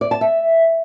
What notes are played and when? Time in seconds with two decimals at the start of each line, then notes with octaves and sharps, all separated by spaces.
0.01 D5
0.11 A5
0.21 E5